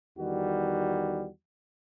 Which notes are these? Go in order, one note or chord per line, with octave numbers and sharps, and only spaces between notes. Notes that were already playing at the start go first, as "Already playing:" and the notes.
E2 D#3 G3 F#4